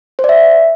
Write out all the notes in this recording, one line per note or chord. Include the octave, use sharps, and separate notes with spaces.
C5
D5
E5